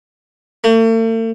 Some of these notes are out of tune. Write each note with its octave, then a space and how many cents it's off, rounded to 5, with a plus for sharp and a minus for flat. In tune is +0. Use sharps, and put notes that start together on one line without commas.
A3 +45